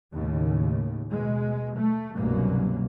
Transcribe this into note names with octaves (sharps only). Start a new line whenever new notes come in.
D#2 A2 C#3
B2 G#3
A3
G1 C2 F#2 B2 F#3 A#3